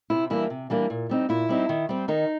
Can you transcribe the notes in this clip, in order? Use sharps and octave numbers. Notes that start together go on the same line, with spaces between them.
C3 E4
E3 G3 A#3 D4 E4
C3
E3 G3 A#3 D4
A#2
G3 C4 D#4
A#2 E4
G3 C4 D#4
D#3
G3 C4
D#3 D#4